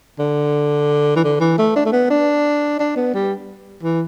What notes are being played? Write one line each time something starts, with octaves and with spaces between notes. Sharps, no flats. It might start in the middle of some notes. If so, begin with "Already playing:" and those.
D3
E3
D3
E3
A3
D4
A3
B3
D4
D4
B3
G3
E3